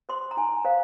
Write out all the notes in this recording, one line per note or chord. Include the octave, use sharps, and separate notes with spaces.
C5 C6
A#5
D#4 G#5
C5 F5